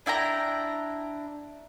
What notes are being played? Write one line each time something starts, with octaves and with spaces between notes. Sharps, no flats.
D4 E4 G5 A#5